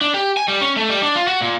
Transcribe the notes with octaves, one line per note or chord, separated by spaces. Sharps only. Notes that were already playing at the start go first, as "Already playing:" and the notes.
D4
G4
G#5
G3
C#4
A3
G3
D4
F4
F#4
A#2